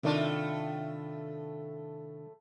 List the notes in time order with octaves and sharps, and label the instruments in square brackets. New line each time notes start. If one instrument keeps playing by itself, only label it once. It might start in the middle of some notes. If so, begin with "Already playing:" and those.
[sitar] A2 A3 F4 [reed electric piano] C3 D#3 D4